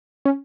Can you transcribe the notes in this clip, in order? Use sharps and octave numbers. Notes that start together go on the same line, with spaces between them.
C#4